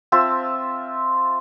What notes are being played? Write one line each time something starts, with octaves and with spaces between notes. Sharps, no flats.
C4 F4 E5 A5